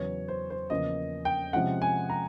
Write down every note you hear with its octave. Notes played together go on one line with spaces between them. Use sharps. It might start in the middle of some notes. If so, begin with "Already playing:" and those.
Already playing: E2 C#3 F#3 B3 C#5
C5
C5
E2 C#3 F3 A#3 C#4 D#5
G5
C3 F3 G#3 C#4 F#5
G#5
A#5